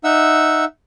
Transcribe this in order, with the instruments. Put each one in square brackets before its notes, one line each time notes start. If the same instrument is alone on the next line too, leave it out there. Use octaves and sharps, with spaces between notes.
[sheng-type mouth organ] D#4 E5 F#5 E6